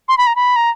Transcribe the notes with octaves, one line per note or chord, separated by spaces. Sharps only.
C6
B5
A#5
B5
A#5